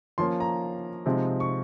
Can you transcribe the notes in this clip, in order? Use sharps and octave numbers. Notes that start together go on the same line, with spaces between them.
F3 A#3 C#4 C6
A#5
C3 F3 G#3 C4 D#4
C#6